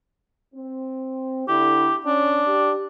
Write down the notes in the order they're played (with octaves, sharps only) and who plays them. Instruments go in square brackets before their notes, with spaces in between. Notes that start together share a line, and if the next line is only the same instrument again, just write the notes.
[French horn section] C4
[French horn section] D3 E4 [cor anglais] G4
[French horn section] C#4 [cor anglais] D4
[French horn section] G4